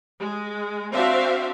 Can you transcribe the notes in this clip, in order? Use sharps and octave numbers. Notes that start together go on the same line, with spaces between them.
G#3
C4 D4 F#4 C5 E5 F5